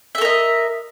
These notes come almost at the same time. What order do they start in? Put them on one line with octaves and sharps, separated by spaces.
E5 A4 A#4 D#5